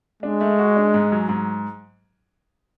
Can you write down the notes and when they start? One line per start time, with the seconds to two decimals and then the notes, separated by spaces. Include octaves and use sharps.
0.23 G#3 D4
0.41 A3
0.59 F#4
0.76 D4
0.94 G#2
1.12 F#3
1.29 G#2